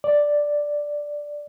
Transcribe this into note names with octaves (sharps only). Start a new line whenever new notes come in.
D5